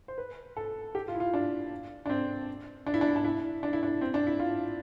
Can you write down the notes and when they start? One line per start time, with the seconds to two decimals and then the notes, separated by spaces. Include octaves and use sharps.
0.08 C5
0.18 B4
0.57 A4
0.95 G4
1.08 F4
1.14 E4
1.20 F4
1.34 D4
2.06 D4
2.09 C4
2.87 D4
2.94 E4
3.01 D4
3.08 E4
3.16 D4
3.25 E4
3.63 D4
3.73 E4
3.83 D4
4.01 C4
4.14 D4
4.27 E4
4.40 F4